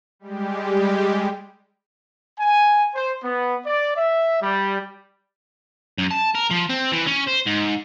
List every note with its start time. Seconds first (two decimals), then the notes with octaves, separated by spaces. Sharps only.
0.19 G3 G#3 G4
2.40 G#5
2.95 C5
3.23 B3
3.65 D5
3.96 E5
4.41 G3
5.98 F#2
6.11 A5
6.35 A#4
6.51 F3
6.70 C4
6.92 E3
7.06 C#4
7.27 C5
7.46 G#2